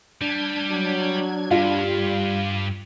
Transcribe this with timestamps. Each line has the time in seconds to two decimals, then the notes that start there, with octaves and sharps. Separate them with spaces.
0.22 G3 D4 G#6
0.70 F#3
1.51 G2 G3 F4